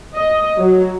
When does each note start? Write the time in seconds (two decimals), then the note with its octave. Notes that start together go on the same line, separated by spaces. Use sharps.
0.16 D#5
0.59 F#3